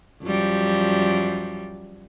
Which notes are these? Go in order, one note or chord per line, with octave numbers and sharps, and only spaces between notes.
F#2 F3 G3